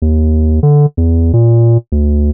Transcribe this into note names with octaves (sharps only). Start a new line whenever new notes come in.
D#2
D3
E2
A#2
D2